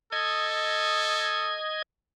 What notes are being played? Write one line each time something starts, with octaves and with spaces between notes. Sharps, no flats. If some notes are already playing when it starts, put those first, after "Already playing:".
A4 D#5 G#6